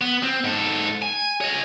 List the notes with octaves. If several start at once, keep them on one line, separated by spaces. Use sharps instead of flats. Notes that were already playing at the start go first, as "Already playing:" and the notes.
B3
C4
G#2 A4
G#5
C#5 D#5